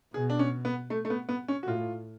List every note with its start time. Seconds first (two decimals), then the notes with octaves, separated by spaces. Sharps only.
0.14 B2 G#4
0.30 D4
0.39 C#4
0.65 B3
0.90 A3
1.05 A3
1.10 B3
1.29 B3
1.48 C#4
1.63 F#4
1.67 A2 F4